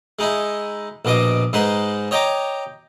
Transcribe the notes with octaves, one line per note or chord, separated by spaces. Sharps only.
G#3 D#4 E4
A#1 B2 D#5 D6 D#6
G#2 G#3 D#4 B4 C6
C#5 D#5 G5 A#5 D6